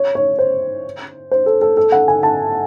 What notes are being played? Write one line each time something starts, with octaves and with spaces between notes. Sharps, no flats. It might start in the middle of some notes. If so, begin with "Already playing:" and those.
Already playing: C#5
C#5
C5
C5
A4
A4
A4
F#5
G#5
A5